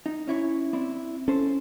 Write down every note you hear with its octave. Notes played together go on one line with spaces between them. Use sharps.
D#4
C#4 E4 C#5
C4 D4 E4
C#4 A4 C5